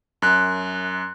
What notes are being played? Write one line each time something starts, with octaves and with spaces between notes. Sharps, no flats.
F#2 F#6